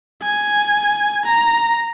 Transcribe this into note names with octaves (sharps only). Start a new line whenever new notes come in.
G#5
A#5